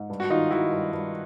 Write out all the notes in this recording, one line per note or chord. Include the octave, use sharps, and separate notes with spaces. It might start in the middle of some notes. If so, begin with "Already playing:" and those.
Already playing: G#2
G2
F#4
D#3 D#4 F4
D#3 E4 F#4
G2
G2